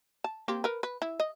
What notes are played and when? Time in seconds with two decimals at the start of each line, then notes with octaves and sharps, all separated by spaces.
0.24 A5
0.48 A#3 C4 G4
0.64 A#4 B4
0.83 B4
1.02 E4
1.20 D#5